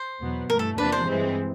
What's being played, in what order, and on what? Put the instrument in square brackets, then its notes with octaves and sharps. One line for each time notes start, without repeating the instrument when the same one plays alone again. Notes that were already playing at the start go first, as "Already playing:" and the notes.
Already playing: [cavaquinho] C5
[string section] E2 B2 F#3 B3
[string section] G2 E3 A3 [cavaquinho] A#4
[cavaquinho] A4
[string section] E2 C3 F3 A#3 D4 [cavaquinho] B4
[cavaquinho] C5
[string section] G2 E3 G#3 C4